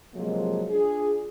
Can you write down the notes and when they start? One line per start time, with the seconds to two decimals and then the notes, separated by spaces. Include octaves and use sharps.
0.15 C3 F3 F#3 G#3 A#3
0.69 D4 F4 G#4